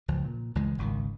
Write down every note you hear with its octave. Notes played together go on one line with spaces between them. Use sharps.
C#2 F3
A#2
C#2 E3 G#3
G#1 C#2 D3 D#3